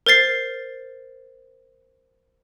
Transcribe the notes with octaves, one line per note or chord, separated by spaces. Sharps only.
A#4 C5 A6 C7